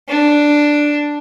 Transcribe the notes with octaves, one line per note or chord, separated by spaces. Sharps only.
D4